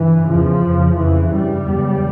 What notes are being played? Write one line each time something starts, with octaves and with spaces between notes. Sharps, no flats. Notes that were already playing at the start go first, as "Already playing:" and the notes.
Already playing: G2 E3
E2 C#3 F3
F2 C#3
F2 C#3 E3
G2 G3
E2 C#3